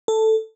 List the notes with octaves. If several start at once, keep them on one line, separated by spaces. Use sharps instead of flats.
A4